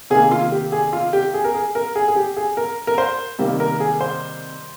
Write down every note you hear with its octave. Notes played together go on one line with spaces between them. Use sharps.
C3 D#3 A#3 G#4
F4
G4
G#4
F4
G4
G#4
A#4
G#4
A#4
G#4
G#4
G4
G#4
A#4
A#4
C5
C3 D#3 G3 A#3
A#4
G#4
C5